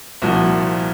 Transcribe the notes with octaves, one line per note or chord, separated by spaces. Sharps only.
C2 A#2 F3 F#4